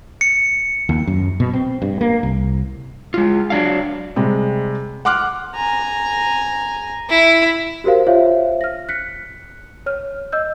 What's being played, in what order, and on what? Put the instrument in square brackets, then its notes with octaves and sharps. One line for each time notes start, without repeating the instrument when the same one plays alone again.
[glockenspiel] C#7
[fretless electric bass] D#2
F#2
B2
C4
G2
A#3
C2
[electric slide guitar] G#3 F4
F#3 D4 F5
[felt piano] C3 G3 G#3
F#5 C6 D6 F6 F#6
[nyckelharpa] G#5 A#5
[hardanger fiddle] E4
[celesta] F#4 G4 A#4 C5 F5
F4 C5 C#5 E5 F5
F6 A#6
F#6 B6 C#7
C#5 F6
D#5 E6 G6